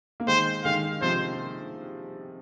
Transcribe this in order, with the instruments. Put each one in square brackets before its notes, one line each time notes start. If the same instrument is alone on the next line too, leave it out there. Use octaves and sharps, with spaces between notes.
[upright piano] A#3
[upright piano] D#3 G#3 [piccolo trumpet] C5
[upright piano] D#3 G#3 [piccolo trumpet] F5
[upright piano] C3 F3 [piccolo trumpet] C5